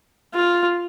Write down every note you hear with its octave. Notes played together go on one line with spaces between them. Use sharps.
F4